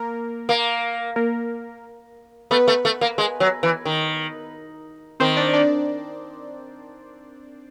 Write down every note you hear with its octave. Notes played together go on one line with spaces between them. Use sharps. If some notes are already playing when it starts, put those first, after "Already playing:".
Already playing: A#3 A#4
A#3
A#3 A#4
A3 B3 B4
A3
A3
A#3
G#3
F#3
E3
D#3
D#3 C4 C5
D4 D5
D4 D5